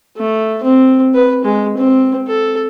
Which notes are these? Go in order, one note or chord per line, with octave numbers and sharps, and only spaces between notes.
A3
C4
B4
G#3
C4
A4